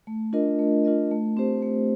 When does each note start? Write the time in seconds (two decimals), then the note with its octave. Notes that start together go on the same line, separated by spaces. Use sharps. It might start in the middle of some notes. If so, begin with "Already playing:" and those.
0.07 A3
0.33 D4 F4 A#4 D#5
0.59 A3
0.85 D4 F4 A#4 D#5
1.11 A3
1.37 C4 G4 C5
1.62 A3